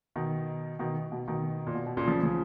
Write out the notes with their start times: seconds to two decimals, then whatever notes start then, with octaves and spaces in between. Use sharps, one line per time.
0.16 B2 D#3
0.79 B2 D#3
1.12 B2
1.28 B2 D#3
1.67 A#2
1.75 B2
1.87 B2
1.97 A#2 C#3
2.08 C#3 F3
2.23 C#3 F3